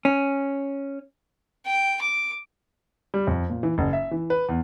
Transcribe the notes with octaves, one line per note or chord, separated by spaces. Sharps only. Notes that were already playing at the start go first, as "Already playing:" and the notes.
C#4
G5
D6
G3
F2
A#2
E3
F#1
E5
E3
B4
E2